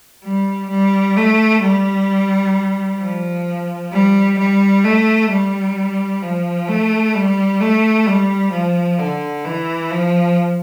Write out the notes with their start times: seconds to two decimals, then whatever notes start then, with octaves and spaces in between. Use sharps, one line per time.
0.25 G3
0.70 G3
1.17 A3
1.62 G3
3.00 F3
3.92 G3
4.39 G3
4.85 A3
5.30 G3
6.23 F3
6.68 A3
7.14 G3
7.60 A3
8.07 G3
8.52 F3
8.99 D3
9.45 E3
9.91 F3